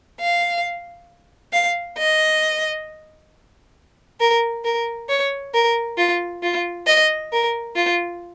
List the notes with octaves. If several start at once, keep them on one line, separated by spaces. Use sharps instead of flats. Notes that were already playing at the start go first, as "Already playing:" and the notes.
F5
F5
D#5
A#4
A#4
C#5
A#4
F4
F4
D#5
A#4
F4